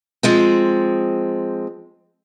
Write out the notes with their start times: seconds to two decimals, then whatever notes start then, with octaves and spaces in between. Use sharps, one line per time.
0.23 F3 G#3 C4